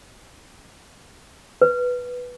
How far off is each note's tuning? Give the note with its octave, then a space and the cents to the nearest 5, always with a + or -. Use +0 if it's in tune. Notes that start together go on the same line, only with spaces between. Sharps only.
B4 +0